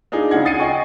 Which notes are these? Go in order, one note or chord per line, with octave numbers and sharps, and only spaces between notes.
D4 D#4 F4 G#4
C#3 F4 F#5 G#6
D#6 A6 C7 C#7 D#7
D#5 G5 G#5 C#6